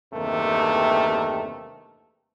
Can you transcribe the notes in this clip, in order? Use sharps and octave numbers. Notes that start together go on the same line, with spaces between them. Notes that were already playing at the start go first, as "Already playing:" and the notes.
E2 G2 C3 D#3 A3 A#3